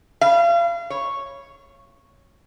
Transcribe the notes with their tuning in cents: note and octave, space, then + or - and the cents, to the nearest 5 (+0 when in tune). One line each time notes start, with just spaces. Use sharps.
F5 -35
C#5 -5